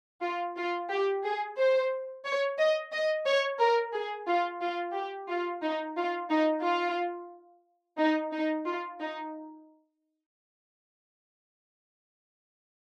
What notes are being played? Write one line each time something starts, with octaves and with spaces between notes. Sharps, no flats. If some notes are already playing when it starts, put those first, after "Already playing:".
F4
F4
G4
G#4
C5
C#5
D#5
D#5
C#5
A#4
G#4
F4
F4
G4
F4
D#4
F4
D#4
F4
D#4
D#4
F4
D#4